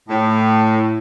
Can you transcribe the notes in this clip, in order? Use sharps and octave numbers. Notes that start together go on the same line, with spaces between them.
A2